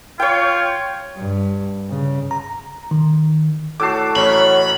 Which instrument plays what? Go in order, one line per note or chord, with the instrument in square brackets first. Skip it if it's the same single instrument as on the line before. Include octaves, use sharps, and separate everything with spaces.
[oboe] F4 [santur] C#5 G5
[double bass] G2
C#3
[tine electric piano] A#5
D#3
[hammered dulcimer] A2 F#4 A5 [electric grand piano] D6 E6 C7
[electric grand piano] A1 C#6 [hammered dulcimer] F#3 F#4 A#4 [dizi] C#5 [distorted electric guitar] B5